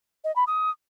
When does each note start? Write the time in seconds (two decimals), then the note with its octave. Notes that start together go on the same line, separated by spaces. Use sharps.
0.24 D#5
0.36 B5
0.47 D#6